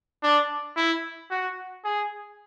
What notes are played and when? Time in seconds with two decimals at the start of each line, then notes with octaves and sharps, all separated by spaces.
0.23 D4
0.77 E4
1.31 F#4
1.85 G#4